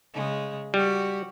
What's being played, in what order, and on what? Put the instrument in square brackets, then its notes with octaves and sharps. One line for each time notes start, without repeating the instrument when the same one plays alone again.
[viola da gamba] C#3 G#3
[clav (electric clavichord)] G3 [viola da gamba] F#4 G4